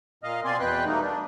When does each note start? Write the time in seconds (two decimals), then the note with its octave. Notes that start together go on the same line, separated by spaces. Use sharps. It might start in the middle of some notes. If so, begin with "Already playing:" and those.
0.23 A#2 D#5 F5
0.45 B2 C4 D5 G#5 C6
0.60 E2 B2 B4 G5 F#6
0.86 G3 A3 A#3 D#4
1.01 D4